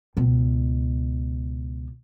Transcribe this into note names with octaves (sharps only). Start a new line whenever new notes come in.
C#2 B2